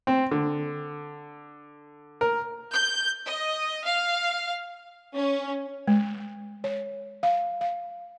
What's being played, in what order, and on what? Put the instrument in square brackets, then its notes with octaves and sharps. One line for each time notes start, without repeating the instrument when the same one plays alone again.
[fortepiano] C4
D3
A#4
[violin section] G6
D#5
F5
[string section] C#4
[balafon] G#3
C#5
F5
F5